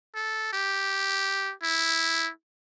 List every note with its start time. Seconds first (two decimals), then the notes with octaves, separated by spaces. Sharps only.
0.15 A4
0.53 G4
1.63 E4